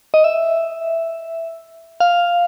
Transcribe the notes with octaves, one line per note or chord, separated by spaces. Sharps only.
D#5
E5
F5